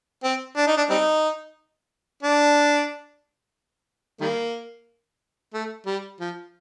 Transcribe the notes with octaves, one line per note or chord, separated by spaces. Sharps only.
C4
D4
D#4
D4
G3 C4 D#4
D4
D#3 G3 A#3
A3
G3
F3